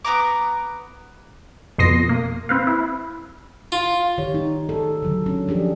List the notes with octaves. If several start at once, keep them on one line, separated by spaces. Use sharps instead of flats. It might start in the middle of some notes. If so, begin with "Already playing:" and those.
B3 G4 A#5 D6
F2 B2 C6 D#6 A#6 C7
A#3
C4 B4 F5
E4
F4
D#3 G4 C#5
D#4
G#4 A4
D3 F#3
C#4 D4
F3 D4 G4 G#4